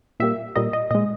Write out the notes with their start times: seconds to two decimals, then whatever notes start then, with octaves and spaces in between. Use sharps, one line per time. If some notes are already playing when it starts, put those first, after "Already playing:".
0.20 A#2 G3 A#3 E5
0.56 A#2 G3 A#3 D#5
0.73 D#5
0.91 A#2 G#3 D#5